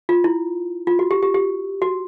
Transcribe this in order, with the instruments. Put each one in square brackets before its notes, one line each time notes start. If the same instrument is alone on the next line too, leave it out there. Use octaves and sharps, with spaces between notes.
[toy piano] F4
E4
F4
F#4
G4
G4
G4
F#4